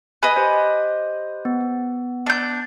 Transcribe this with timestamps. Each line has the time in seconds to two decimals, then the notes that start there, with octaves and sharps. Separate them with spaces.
0.23 B4 D#5 G#5
0.36 G4 C5
1.45 B3
2.26 D4 G6